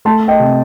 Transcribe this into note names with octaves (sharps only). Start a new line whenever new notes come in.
A3 A5 C6
D#5 G5
C3